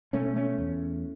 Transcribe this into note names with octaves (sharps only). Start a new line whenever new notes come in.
B2 A3 C#4
A3 C#4
E2